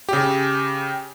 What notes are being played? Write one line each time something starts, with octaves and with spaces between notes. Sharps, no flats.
C#3 G4